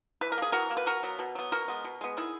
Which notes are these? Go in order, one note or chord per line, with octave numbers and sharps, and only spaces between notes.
E3 B4
A#4
A#3 G#4
E3 F#4 A#4
A#3
B4
B2 F#4 A#4
F#3 B3
B2
F#3 B3
B2 F#4 A#4
G#3 B3
B2
G#3 B3
D#3 E4 G#4